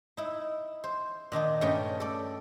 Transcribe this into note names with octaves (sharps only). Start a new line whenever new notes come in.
D#4 E4
C5
A#2 D#3 D4 D#4
G2 A3 C#4 D#5 G5
A4 D5